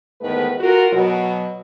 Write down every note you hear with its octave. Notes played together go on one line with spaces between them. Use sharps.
E2 G#2 D#3 A3 B3 B4
F4 F#4 A#4
B2 F#3